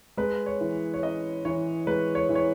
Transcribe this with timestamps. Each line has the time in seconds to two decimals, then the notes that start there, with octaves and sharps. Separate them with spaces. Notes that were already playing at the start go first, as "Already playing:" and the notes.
0.17 G#3 B4
0.46 C#5
0.61 E3
0.94 C#5
1.03 C#4 D#5
1.45 E3 C#5
1.87 G#3 B4
2.15 C#5
2.29 E3
2.35 C#5